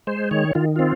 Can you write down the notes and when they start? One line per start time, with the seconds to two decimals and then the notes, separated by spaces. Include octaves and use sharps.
0.07 G#3 C5
0.31 D#3 C#5
0.55 D#3 F4
0.76 C4 F4